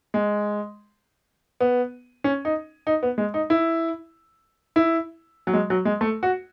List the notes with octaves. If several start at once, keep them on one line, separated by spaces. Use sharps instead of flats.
G#3
B3
C#4
D#4
D#4
B3
G#3
D#4
E4
E4
F#3
G#3
F#3
G#3
A3
F#4